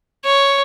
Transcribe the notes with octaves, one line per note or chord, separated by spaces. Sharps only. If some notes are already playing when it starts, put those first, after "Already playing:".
C#5